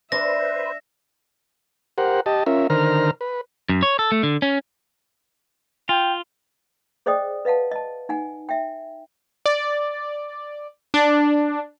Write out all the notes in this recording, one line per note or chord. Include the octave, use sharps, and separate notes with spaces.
D4 B4 C5 E5 A#6
G4 A#4 C5 F#5
G4 D#5 A5
C#4 F4 A#4 E5
D3 D#3 A#4 C5 A#5 F6
B4
F#2
C#5
A4
A3
D3
C#4
F4 G5
G#4 C5 D5 D#5 G5 D#6
B4 D#5 F5 F#5 A5
D#5 A5
D#4 F#5 G#5
E5 G5
D5
D4